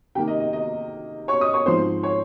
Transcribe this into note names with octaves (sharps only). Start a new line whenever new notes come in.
C3 D#3 A#3 G4 G5
D#5
D#5
D#5
C#5 C#6
D#5 D#6
C#5 C#6
G#2 F3 C4 C5 C6
C#5